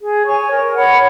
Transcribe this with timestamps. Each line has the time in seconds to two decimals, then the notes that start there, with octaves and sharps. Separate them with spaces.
0.01 G#4
0.25 C#5 G#5 C#6
0.50 A#4
0.74 C#5 F#5 B5